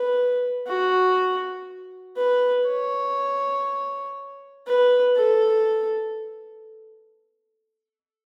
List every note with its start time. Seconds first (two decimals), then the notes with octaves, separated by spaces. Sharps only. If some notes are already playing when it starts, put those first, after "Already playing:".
Already playing: B4
0.67 F#4
2.17 B4
2.67 C#5
4.67 B4
5.16 A4